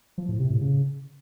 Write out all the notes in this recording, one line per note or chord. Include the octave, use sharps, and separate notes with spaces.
F3
A2
C3
A2
C#3